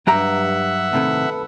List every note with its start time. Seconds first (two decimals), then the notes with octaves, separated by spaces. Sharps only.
0.07 G2 F#3 G4 E5 F#5 A#5
0.93 A2 C3 D#3 A4 B4